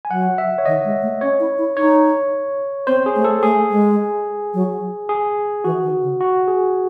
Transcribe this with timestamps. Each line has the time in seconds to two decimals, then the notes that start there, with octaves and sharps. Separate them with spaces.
0.05 G#5
0.10 F#3 F#5
0.38 E5
0.58 C#5
0.65 D#3 D#5
0.84 G#3
1.02 A3
1.21 C#4 C#5
1.40 E4
1.58 E4
1.77 D#4 C#5
2.87 C4 C5
3.06 G#4
3.16 A3
3.24 A4
3.43 A3 G#4
3.71 G#3
4.54 F#3
5.09 G#4
5.64 E3 F#4
5.83 D#3
6.02 C#3
6.20 F#4
6.48 G#4